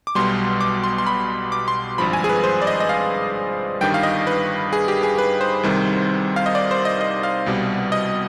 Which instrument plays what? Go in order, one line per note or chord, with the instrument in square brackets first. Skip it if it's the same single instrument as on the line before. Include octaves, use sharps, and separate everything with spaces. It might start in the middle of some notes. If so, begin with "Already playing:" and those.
[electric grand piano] D6
B1 B2 G3 C6
D6
C6
C6
B5
D6
C6
G#1 G2 F3 B5
G#5
G#4
B4
C5
D5
D#5
D#5
F5
G1 G2 D#3 G3 G5
F5
D#5
B4
G#4
G4
G#4
B4
C5
C2 C3 D#3 G3
F5
D#5
D5
C5
D#5
D#5
F5
C2 B2 G3
D#5